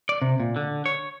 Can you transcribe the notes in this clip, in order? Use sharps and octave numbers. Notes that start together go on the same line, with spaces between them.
D5
C3
A#2
D3
C#5